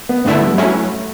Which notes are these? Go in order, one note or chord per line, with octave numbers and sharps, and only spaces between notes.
B3
G2 D3 A3 B3 E4
G3
G3
G2 F#3 A3 C#4 E4